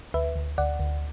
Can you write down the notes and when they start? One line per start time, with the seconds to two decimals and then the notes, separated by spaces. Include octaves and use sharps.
0.14 D2 B4 E5
0.36 D2
0.58 D2 D5 F#5
0.79 D2